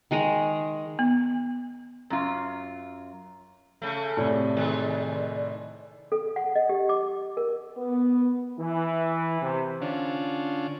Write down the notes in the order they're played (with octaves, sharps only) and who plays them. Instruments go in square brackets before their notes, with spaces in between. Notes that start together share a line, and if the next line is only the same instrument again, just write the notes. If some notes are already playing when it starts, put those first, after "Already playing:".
[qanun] D#3 G#3 G#4 A#5
[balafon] B3
[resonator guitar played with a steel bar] F#2 F4
[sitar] C#3 A3
[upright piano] A2 C3 [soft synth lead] D5
[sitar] D#3 G#3
[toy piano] A4
F#5
D#5
G4
D6
A#4
[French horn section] B3
[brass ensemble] E3
C3
[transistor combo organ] D3 C#4 D4 F4